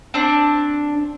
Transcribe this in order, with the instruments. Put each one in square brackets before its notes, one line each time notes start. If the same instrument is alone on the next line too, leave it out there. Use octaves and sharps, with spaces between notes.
[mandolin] C4 D4